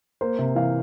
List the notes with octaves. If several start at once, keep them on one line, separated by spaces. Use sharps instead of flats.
A#3 C5
C3
E3 F5